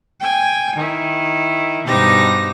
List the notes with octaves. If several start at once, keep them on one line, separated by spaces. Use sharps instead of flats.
G5 G#5
D#3 E4
G2 B2 D#4 G4 C5 A#6